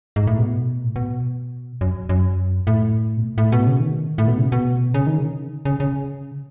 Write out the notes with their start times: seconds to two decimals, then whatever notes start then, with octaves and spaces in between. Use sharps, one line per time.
0.16 G#2
0.27 A2
0.39 B2
0.84 A2
0.96 B2
1.81 F#2
2.09 F#2
2.67 A2
3.17 B2
3.24 A2
3.38 A2
3.52 B2
3.66 C#3
3.80 D#3
4.18 A2
4.28 B2
4.38 C#3
4.52 B2
4.94 C#3
5.07 D#3
5.18 C#3
5.65 C#3
5.80 C#3